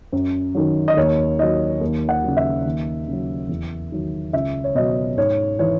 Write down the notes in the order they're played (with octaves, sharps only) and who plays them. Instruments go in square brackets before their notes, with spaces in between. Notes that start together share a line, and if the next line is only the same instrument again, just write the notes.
[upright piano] F#2
D#3 F#3
D#5
D#2 C#5
D#3 F#3 D#5
D#2
F#5
C#3 F#3
E5
D#2
C#3 F#3
E2
D#3 F#3
C#2 E5
C#5
B2 F#3 D#5
G#2 C#5
E3 C#5